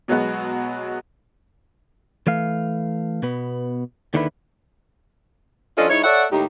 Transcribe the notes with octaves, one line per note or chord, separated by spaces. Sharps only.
B2 F#3 G#3 B3 F#4
E3 A3 F5
B2 B3
D#2 D3 D#3 D4 E4 B4
F3 C#4 D4 F4 A4 D#5
G#2 D#4 E4 C#5
A4 C#5 D5 E5 F#5
D#2 A2 D#4 G4